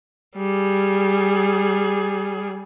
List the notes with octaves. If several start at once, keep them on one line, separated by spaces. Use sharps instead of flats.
G3 G#4